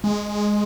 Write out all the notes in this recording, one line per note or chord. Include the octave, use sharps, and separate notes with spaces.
G#3